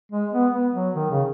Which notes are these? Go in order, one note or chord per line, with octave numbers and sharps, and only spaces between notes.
G#3
B3
B3
F#3
D#3
C#3